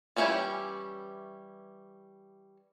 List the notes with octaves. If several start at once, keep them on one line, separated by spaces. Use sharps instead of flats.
E3 G3 C#4 E4 G4